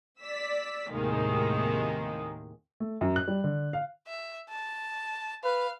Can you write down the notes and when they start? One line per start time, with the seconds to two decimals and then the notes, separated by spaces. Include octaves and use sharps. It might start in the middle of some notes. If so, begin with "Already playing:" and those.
0.21 D5 E6 B6
0.91 D#2 A2 C3 D#3 G#3 A#3
2.80 A3
3.01 F#2
3.16 F#6
3.28 G3
3.44 D3
3.73 F5
4.07 E5
4.49 A5
5.44 B4 F5